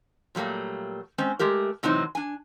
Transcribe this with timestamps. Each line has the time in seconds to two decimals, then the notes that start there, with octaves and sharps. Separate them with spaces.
0.35 A#2 F#3 G3 A3 A#3
1.18 G#3 C4 C#4
1.39 G#3 A3 G4 A#4
1.83 A2 C3 E3 F#3 C4 D#4
2.15 D4 G#5